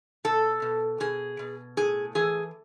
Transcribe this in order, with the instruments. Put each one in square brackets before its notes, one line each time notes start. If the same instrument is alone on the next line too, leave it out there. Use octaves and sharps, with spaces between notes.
[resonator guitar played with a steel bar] B2 A4
B2
B2 G#4
B2
A2 G#4
E3 G#4